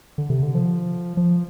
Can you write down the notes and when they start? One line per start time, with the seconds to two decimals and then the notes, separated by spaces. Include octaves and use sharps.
0.18 D3
0.30 C3
0.43 D3
0.55 F3
1.17 F3